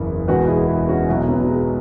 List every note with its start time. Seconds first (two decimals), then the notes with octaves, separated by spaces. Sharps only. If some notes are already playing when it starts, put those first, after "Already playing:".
Already playing: F#1 E2 C#3 E3 E4
0.28 E1 E2 B2 F#4 B4
0.48 E4 G#4
0.68 B3 E4
0.88 C#4 F#4
1.08 B1 B2 B3 E4
1.29 F#3 B3
1.41 F#3
1.49 G#3